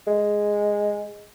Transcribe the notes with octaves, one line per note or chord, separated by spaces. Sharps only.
G#3